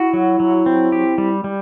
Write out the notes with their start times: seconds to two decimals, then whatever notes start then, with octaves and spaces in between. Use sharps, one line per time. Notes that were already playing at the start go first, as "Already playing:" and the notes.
Already playing: E4 F#4
0.13 F#3
0.40 F#3
0.66 C4
0.92 G4
1.18 G3
1.44 G3